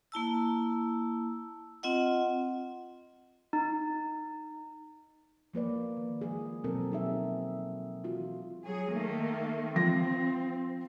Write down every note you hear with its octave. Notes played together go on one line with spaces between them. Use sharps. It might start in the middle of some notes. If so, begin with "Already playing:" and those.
A#3 E4 A5 E6
C4 F4 D#5 F#5
D#4
F3 A#3 B4 D5
D#3
F3 G#3 G#4
B2 F#3 C4 A4 A#4
D#4 G#4 E5
E3 F4 F#4
F#3 G#4
D#3 A3 A#3
F3 C4 A#6